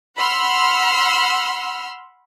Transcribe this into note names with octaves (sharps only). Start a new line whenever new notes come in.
F#5 B5 C6 E6 F6